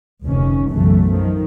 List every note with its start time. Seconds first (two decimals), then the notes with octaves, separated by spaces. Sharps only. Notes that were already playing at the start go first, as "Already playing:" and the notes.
0.24 F1 D2 C3 D#3 C#4
0.69 B1 F#2 C#3 E3 A3
1.10 D#3 F3